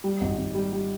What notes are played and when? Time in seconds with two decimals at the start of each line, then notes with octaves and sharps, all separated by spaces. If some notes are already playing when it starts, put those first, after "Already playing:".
0.04 G3
0.21 G#1
0.38 G#1
0.55 G3
0.72 G3